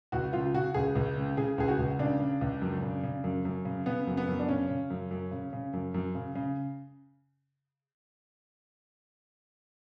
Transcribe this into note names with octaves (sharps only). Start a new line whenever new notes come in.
C#2 F#4
C#3 F4
C#3 F#4
C#2 G#4
C#2
C#3
C#3 G#4
C#2 G#4
F#4
C#2
C#3 D4
C#3
C#2
F#2
C#3
C#3
F#2
F#2
C#3
C#3 B3
F#2
B3
F#2
D4
C#3 C#4
C#3
F#2
F#2
C#3
C#3
F#2
F#2
C#3
C#3